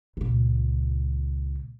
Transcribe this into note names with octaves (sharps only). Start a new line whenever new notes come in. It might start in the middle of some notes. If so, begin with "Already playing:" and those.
C#2 A#2